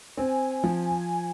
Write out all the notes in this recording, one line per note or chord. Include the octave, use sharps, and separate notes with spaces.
C4 G#5
F3